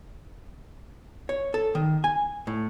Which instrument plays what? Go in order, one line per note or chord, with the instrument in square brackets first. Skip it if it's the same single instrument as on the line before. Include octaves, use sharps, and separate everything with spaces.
[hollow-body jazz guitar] C#5
A4
D#3
G#5
A2